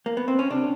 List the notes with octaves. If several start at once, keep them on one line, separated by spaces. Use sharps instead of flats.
A#3
B3
C4
C#4
C3 D4